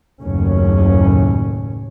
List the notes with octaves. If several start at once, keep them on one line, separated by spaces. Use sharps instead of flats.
F#1 D#2 A2 C#4